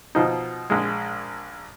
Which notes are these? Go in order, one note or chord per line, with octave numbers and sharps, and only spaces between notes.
B2 F3 D#4
A#1 G#3